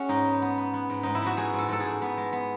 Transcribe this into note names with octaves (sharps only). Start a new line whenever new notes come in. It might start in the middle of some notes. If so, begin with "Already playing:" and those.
Already playing: C#4 F#4 G#4
G#2 D#4
B3
B3
B3
B3
G#2
G#2 D#4
E4
B3 F#4
G#2 G#4
G#2 A4
G#2 A4
G#4
G#2
B3
G#3
B3